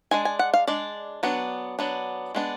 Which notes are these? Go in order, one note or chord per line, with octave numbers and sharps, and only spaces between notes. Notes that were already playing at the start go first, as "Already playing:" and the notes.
G#3 D4 G#5
G#5
F#5
F5
G#3 D4 D5
F#3 B3 D4
F#3 B3 D4
G#3 B3 D4